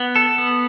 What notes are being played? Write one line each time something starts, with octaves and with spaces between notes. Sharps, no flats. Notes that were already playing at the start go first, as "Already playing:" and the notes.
Already playing: B3
A4
B3